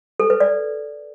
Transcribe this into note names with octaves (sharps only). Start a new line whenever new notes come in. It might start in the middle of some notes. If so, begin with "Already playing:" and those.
A4
B4
D5